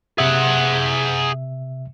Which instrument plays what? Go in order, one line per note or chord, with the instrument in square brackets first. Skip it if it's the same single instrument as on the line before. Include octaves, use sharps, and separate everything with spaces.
[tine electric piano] C3 E5 [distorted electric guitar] G#4 F#5